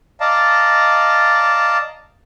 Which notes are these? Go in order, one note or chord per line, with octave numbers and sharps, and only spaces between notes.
D5 D#5 F5 A5 A#5